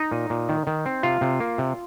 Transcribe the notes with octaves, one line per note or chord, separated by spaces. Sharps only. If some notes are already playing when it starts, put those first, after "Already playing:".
Already playing: D#4 D#5
A#2
A#2
D#3
D#3
C4
C3 F4 F5
C3
A#3
C3